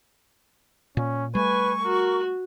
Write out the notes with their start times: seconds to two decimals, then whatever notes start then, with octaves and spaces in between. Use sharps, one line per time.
0.97 A#2 C#4
1.35 G3 A3 B4 G#5 C#6
1.82 F#4 A#4